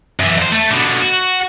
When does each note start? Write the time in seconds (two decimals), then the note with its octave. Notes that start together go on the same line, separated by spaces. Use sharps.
0.19 F#2 E3
0.37 F2 C5
0.52 A3
0.71 B2 D3
1.02 F#4